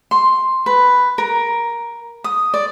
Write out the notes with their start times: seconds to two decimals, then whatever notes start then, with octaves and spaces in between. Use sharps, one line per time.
0.11 C6
0.66 B4
1.18 A#4
2.24 D#6
2.54 D5